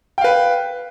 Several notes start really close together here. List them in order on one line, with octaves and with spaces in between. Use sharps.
G5 F5 B4